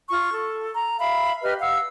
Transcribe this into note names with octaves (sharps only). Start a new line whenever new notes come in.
F4 C#6
A4
A#5
E5 F5 B5
G4 B4 D#5 F6
F5 F#5 E6